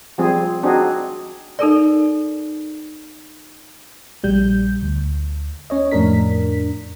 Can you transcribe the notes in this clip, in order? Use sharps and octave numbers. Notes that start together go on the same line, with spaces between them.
F3 G3 C4 G#4
C4 D4 D#4 F#4 G#4
D#4 A4 A#4 D5
A#1 G3 G6
D2
C#4 C#5 D#5
F2 A2 D4 A#4 B6